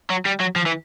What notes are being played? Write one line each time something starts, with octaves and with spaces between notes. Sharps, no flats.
F#3
G3
F#3
F3
E3